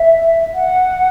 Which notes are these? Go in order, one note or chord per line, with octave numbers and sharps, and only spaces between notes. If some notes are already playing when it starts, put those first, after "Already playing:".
Already playing: E5
F#5